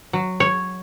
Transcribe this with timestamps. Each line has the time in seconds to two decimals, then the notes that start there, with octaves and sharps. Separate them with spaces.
0.13 F#3
0.40 C#5